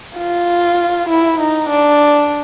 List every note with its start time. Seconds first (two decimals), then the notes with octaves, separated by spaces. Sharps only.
0.16 F4
1.09 E4
1.40 D#4
1.70 D4